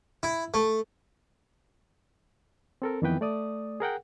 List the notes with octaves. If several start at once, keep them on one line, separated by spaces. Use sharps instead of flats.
E4
A3
C4 A4 A#4
F2 D#3 E3 B3 B4 G5
A3 D5 D#6
G#4 A#4 F#5 G5